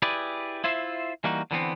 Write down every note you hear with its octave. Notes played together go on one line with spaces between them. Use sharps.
E4 G4 G#4 B4 D5
E4 F4 C5 E5
E3 G3 A#3 D#4 F#4
D3 E3 B3 C4